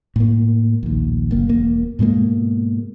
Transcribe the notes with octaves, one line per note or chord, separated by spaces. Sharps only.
A2 A#3
A#1 D#2
F#1 A#3
E1 A#3
G#2 B2 G#3 A#3